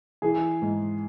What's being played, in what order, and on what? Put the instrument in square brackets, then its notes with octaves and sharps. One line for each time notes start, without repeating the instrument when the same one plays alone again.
[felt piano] E3 [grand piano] G#4
[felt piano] G#2